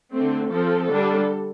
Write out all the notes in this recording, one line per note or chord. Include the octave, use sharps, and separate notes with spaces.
D3 A3 C4
F3 C4 A4
D3 G3 D4